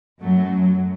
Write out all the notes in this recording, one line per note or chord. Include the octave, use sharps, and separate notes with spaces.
F#2 F#3 A3